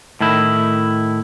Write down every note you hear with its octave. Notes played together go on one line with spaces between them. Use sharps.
A2 D#3 E4